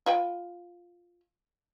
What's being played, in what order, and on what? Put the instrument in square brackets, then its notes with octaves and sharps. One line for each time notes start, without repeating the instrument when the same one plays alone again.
[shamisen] F4 B4 G5